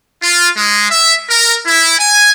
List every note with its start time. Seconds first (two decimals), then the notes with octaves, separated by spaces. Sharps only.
0.22 F4
0.57 G#3
0.91 E5
1.29 A#4
1.66 E4
1.99 G#5